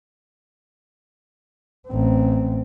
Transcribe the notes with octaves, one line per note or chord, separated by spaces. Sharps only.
A1 C4